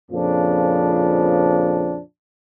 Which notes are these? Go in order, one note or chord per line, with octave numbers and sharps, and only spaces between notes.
F2 A#2 C#3 F3 D4